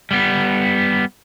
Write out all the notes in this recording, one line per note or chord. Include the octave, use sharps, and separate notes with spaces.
G3 B3